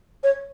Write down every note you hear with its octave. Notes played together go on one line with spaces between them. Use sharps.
C#5